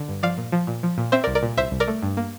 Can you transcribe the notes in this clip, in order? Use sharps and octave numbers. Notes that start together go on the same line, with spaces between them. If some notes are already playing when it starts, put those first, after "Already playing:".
Already playing: D3
G2
F3 D5 F5
A#2
F3
A#2
F3
A#2
C4 C5 E5
A#4 D5
C2
A#4 D5
A#2
C2 C5 E5
C2
A#4 D5
A3
G2
A#3